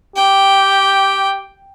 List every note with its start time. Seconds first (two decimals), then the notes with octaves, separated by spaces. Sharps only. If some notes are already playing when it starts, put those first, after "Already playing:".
0.16 G4 G5